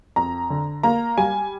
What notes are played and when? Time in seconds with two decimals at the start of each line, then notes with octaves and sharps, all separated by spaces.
0.16 F2 A#5
0.50 D3
0.83 A#3 A#5
1.18 G3 G#5